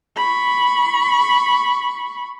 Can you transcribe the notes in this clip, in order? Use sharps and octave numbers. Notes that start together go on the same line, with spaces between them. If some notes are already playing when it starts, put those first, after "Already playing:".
B5 C#6